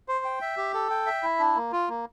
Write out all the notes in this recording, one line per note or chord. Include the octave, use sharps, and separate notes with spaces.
C5
G5
E5
G4
A4
G5
E5
E4
D4
A#3
F4
A#3